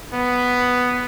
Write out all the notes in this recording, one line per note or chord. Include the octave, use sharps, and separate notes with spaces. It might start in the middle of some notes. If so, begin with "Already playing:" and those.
B3